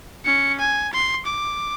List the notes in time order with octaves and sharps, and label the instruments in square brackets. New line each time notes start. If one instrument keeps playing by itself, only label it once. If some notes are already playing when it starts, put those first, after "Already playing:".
[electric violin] C#4 C#7
G#5
C6
D6